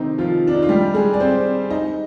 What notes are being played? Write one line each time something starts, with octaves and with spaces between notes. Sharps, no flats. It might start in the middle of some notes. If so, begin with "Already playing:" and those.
Already playing: C3 D#3 C4 D#4
F3 F4
D4
D#4
F4
G3 G4
G#3 G#4
D5
C4 C5
D#4 D#5